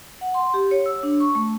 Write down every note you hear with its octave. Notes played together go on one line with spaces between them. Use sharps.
F#5
C6
G4
C#5
E6
D4
C#6
A3